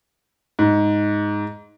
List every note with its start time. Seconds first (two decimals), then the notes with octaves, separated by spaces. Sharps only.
0.59 G#2